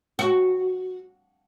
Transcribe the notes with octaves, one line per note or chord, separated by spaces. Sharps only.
F#4